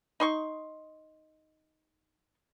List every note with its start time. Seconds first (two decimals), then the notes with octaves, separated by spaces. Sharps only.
0.20 D#4 C6 C#6